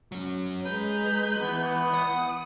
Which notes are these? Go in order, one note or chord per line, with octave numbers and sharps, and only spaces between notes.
F#3 C#4
G#3 B4 A#5 G6
E3 B3
F#5 D#6